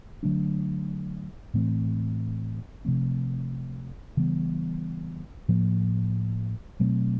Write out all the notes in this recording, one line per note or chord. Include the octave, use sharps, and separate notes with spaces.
D3 F#3 A3 D4
A2 E3 A3 C4
C3 F3 A3 C4
C#3 E3 G3 B3
A2 F3 A#3
B2 F#3 A3 C4